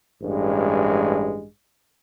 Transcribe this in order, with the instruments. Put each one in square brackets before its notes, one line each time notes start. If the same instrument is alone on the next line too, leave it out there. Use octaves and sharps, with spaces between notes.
[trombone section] A1 G2 G#3